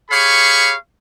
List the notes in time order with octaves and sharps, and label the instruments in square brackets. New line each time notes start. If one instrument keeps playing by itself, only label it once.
[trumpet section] G4 G#4 C#5 F5 B5 C#6